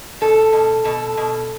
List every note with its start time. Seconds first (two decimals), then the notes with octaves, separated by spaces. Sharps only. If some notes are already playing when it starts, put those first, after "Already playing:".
0.21 B2 A4
0.53 B2
0.84 B2 A4
1.17 B2